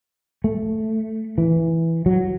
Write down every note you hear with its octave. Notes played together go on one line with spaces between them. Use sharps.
A3
E3
F#3